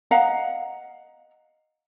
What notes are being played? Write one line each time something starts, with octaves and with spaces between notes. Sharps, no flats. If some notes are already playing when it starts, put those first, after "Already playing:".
D#5 F5 F#5 A#5